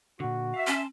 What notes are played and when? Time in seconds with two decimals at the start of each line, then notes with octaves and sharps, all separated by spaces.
0.20 A#2 D3 F#4
0.54 E5 F5
0.67 C#4 A5 C6